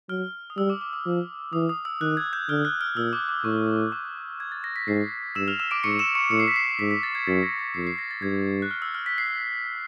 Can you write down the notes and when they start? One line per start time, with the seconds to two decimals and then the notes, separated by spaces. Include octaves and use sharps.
0.09 F#3 F6
0.50 D#6
0.57 G3 E6
0.70 D6
0.81 D6
0.93 D6
1.06 F3
1.53 E3 D#6
1.69 D#6
1.85 E6
2.01 D#3 F#6
2.17 G#6
2.33 G6
2.49 D3 F6
2.65 F#6
2.81 F6
2.96 A#2 E6
3.13 D6
3.28 D6
3.45 A2 C#6
3.92 D6
4.40 G#6
4.52 A6
4.64 A#6
4.76 B6
4.88 G#2 C7
5.35 G2 E6 E7
5.48 F6 F7
5.60 E6 E7
5.71 D6 D7
5.84 G#2 C#6 C#7
5.99 E6 E7
6.15 C#6 C#7
6.31 A2 C#7
6.40 C7
6.48 B6
6.56 C7
6.79 G#2 B6
6.91 B6
7.03 A6
7.15 G#6
7.27 F#2 A6
7.43 A#6
7.59 B6
7.74 F2 C7
7.87 C7
7.98 A#6
8.11 A6
8.22 G2 G#6
8.62 F#6
8.71 F6
8.82 E6
8.95 F6
9.06 B6
9.18 C7